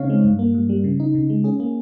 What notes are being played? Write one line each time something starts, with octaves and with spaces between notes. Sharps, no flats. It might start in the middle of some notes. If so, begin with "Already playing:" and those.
Already playing: C#3 C4 D#4 C#5 F5
G#3
G2
A#3
G2
G3
C#3
D#4
C#3
G#3
C#4 G#4
A#3